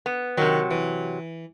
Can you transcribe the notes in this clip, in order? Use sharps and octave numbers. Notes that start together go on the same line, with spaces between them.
B3
C3 D#3 F#3
E3